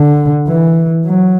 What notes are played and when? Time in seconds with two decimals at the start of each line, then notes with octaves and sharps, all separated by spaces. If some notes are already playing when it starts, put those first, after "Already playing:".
Already playing: D3
0.48 E3
1.06 F#3